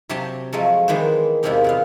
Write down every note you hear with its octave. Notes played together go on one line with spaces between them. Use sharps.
C3 F#3 G4 G#5 A5 C6
F3 F#3 G#3 A3
D#3 E3 G#3 B3 C5
E2 C3 G#3 A#3 C4 D#4
A#2 B3 F5